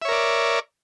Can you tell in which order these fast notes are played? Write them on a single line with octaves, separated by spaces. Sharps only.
E5 C#5 A#4 D5